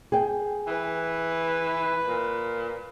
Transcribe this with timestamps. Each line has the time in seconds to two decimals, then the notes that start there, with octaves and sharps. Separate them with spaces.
0.12 G#4 G5
0.67 E3 B4
2.06 A#2